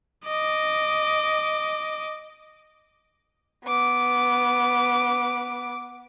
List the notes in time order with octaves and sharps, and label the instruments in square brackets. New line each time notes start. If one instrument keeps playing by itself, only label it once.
[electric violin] D#5 D6
[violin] B3 D6